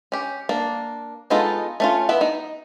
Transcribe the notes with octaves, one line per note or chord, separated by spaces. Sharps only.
C#4 G4
A#3 D4
G#3 B3 D#4 F4 A4
A3 C#4 F4
B3 E4 B4
D#4